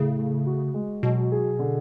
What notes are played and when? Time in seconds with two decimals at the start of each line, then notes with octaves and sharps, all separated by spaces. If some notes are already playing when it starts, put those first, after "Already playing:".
Already playing: A2 C#3
0.19 A3
0.46 F#4
0.74 G#3
1.03 B2 F#3
1.32 G#4
1.59 D3